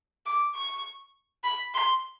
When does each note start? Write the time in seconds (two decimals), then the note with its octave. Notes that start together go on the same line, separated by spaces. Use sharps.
0.26 D6
0.55 C#6
1.44 B5
1.74 C6